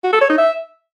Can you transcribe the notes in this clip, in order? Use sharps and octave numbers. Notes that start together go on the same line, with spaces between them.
F#4
A4
C#5
D#4
E5